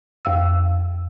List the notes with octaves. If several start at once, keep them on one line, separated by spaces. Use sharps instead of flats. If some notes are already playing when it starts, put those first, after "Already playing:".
F2 F5 E6